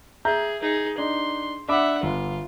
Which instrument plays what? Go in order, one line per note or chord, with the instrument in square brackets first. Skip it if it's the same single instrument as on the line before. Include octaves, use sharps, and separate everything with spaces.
[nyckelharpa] G#4 [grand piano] E5 A#5 G6
[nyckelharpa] D#4 G#4
[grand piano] D4 D#4 [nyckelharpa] C6
[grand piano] D4 B5 D6 [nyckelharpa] E5 F#5
[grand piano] G1 [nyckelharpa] F4